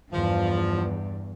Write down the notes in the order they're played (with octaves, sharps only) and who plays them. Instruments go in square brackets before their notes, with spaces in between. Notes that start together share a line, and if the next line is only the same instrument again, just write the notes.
[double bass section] E2 [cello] G2 [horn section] F3